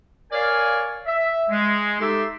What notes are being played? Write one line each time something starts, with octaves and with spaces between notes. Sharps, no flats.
A#4 C#5 D5 F5 G#5
E5
G#3
D#4 G4 A4 E5 C6 D6